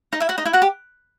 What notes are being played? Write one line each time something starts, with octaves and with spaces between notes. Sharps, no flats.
D#4 D#5
E4 E5
F#4 F#5
D#4 D#5
E4 E5
F#4 F#5
G4